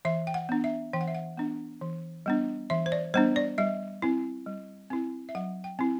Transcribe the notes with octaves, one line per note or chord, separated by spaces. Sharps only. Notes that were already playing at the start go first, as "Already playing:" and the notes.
E3 E5
G5
F#5
B3 D4
E5
E3 G5
F#5
E5
F#5
B3 D4
E3
G3 B3 D4
E3 E5
C5
D5
G3 B3 D4 C5
D5
G3 E5
C4 E4
G3
C4 E4
E5
F#3 F#5
G5
C4 E4